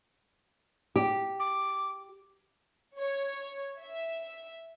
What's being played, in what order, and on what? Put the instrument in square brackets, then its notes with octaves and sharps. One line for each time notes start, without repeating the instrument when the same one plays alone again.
[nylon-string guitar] G4
[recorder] D6
[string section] C#5
E5